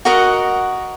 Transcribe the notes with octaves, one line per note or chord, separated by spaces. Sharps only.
F#4 A#4 D#5 F#5